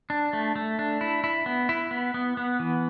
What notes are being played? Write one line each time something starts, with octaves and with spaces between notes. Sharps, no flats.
D4
A3
A3
D4
E4
E4
B3
E4
B3
B3
B3
E3